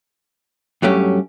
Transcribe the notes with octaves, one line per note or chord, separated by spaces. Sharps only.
G2 F#3 A3 C#4 G4